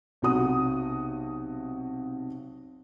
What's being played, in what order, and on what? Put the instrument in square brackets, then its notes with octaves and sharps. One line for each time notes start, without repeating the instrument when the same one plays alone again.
[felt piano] B1 C3 F#4 D#6